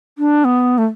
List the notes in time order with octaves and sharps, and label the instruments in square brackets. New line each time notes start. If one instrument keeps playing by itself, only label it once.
[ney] D4
B3
A3